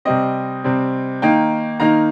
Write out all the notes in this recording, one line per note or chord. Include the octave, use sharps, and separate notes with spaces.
C3 G3 C4 D#5
C3 G3 C4
D#3 A#3 D#4 G5
D#3 A#3 D#4 A#5